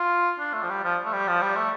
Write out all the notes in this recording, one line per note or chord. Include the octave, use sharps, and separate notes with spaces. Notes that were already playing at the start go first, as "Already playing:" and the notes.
Already playing: F4
D4
A3
F3
G3
F3
A3
G3
F3
G3
A3